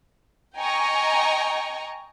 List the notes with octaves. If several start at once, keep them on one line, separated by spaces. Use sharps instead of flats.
D#5 G5 G#5 A#5 C#6